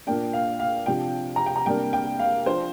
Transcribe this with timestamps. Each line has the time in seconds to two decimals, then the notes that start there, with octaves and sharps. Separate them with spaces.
0.07 A#2 A#3 D4 G5
0.33 F5
0.60 F5
0.86 C3 F3 D4 G5
1.36 A#5
1.46 G5
1.56 A#5
1.66 C3 G3 A#3 D4 G5
1.93 G5
2.19 F5
2.46 F3 D4 C5